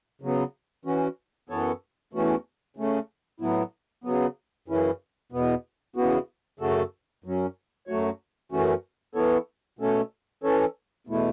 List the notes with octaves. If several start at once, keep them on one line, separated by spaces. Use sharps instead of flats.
C#3 F#3 B3
E3 C#4 F#4
F#2 E3 B3 A4 C#5
E2 E3 A3 C#4 F#4
C#3 A3 C#4
A2 F#3 B3 E4
C#3 F#3 B3
F#2 C#3 E3 C#4 E4
E2 B2 B3
E2 C#3 E3 B3 F#4
F#2 C#3 A3 F#4 A4
F#2 F#3 C#4
F#2 F#3 A3 F#4 C#5
F#2 E3 A3 C#4 F#4
E3 B3 E4 A4 C#5
B2 A3 C#4 A4 C#5
E3 C#4 A4 C#5
E2 B2 A3 E4